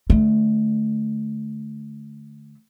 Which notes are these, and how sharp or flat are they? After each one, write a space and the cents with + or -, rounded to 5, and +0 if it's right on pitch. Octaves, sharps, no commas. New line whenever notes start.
D3 +0 A3 -20